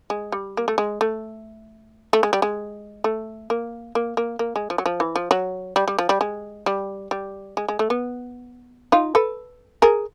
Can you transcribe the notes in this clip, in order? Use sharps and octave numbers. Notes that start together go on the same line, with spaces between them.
G#3
G3
A#3
A3
G#3
A3
A3
G#3
G3
G#3
A3
A#3
A#3
A#3
A#3
G#3
F3
F#3
F3
E3
F3
F#3
G3
G3
F3
G3
G#3
G3
G3
G#3
G#3
A3
B3
D#4 F4
A4 B4
G#4 A#4